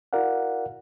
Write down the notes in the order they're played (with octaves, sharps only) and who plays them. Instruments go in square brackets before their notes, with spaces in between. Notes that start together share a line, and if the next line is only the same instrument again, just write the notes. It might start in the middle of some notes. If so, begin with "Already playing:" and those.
[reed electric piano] E4 F#4 A#4 D5 F5 F#5